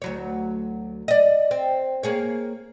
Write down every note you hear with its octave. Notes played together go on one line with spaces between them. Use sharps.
D2 F#3 C#5
D5 D#5
C4
A#3 G#4 C#5